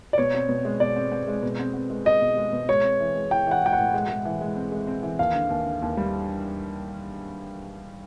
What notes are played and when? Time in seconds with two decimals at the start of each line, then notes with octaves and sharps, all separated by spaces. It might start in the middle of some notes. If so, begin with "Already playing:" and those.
0.13 D5
0.18 B2 C#5
0.34 C4
0.49 B2
0.65 G#3
0.80 B2 D5
0.96 C4
1.12 C4
1.28 G#3
1.43 B2
1.59 C4
1.74 C4
1.90 G#3
2.05 C4 D#5
2.22 B2
2.37 G#3
2.53 B2
2.69 G#3 C#5
2.83 C4
3.00 E3
3.15 G#3
3.31 E3 G5
3.47 E3 F#5
3.62 G#3 G5
3.73 A2 F#5
3.94 G#3
4.09 G#3
4.25 E3
4.41 G#3
4.56 C4
4.72 G#3
4.87 C4
5.03 E3
5.19 D#2 F5
5.35 D3
5.50 D#2
5.66 D3
5.82 D#2
5.97 G3